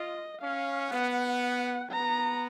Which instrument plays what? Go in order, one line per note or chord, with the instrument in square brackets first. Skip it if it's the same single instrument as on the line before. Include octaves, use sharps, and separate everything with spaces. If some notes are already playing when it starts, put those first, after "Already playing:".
Already playing: [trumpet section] F4 [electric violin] D#5
[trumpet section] C#4 [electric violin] F5
[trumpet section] B3 [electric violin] F#5
[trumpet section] B3 [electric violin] A#5